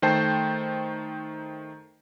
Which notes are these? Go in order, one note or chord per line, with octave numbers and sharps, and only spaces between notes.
D#3 A3 C5 G5 A5 C7